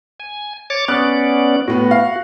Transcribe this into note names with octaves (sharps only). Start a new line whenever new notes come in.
G#5
C#5 D6 A6
B3 C#4 D5 F#6
A2 B3 F#4
F5